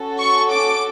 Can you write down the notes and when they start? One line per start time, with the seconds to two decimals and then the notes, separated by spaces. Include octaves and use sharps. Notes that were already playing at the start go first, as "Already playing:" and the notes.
Already playing: C#4 F#4 A4
0.18 C#6
0.51 D6